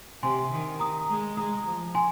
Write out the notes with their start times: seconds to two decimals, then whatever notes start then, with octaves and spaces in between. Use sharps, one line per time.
0.22 C3 G#5 C6
0.52 D#3
0.80 A#5 D#6
1.09 G#3
1.37 G#3 A#5 D#6
1.66 F3
1.95 G#5 C6